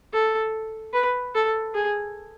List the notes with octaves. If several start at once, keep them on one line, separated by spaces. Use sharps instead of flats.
A4
B4
A4
G#4